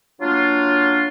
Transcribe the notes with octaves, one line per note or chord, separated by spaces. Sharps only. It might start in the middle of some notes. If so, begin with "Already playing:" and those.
F#3 A#3 D4 F4